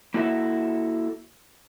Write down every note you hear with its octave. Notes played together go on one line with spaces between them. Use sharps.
A#3 E4 F#4 A4 E5